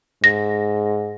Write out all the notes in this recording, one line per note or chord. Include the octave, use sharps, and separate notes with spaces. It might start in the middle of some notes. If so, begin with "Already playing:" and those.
G#2 A#6